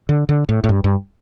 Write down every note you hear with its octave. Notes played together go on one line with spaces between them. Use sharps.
D3
D3
A2
A2
G2
G2